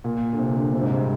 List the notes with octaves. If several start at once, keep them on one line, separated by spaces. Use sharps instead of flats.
A#2
D3
C3
D3
C3
G#2
G2